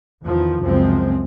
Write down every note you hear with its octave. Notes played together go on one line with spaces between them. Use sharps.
E2 D#3 F3
C#2 F#2 C#3 F3 G#3 C4